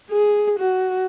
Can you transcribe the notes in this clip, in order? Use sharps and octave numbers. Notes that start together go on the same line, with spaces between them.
G#4
F#4